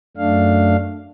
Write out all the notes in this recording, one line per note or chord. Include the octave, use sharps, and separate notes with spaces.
F#2 A3 D4 F5